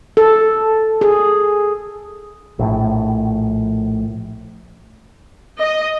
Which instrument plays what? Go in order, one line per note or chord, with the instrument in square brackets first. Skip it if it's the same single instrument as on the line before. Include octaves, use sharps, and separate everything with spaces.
[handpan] A4
G#4
[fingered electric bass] A#1 A2
[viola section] D#5